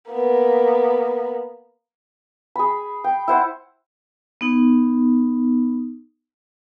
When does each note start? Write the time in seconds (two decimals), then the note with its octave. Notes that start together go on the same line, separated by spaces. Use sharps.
0.11 A#3 B3
2.56 G#4 B5
3.04 G5
3.28 E4 C5 F#5
4.41 B3 D#4